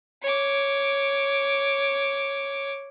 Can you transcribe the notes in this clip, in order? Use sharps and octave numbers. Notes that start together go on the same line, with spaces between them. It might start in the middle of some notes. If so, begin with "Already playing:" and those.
C#5 D6